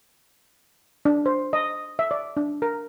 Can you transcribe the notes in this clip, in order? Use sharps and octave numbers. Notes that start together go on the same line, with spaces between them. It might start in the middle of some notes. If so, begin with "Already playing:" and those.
D4
C5
D#5
E5
D5
D4
A#4